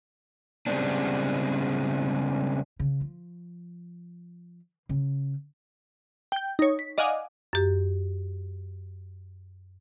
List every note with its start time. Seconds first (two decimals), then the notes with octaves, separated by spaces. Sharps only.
0.67 C#3 G3 G#3 B3 C4 D4
2.79 C#3
3.01 F3
4.89 C#3
6.32 G5 G6
6.59 D#4 C#5
6.79 B6
6.98 D5 D#5 F5 F#5 G#5 D6
7.53 F#2 G4